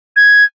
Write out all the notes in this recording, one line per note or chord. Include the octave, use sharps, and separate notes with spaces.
G#6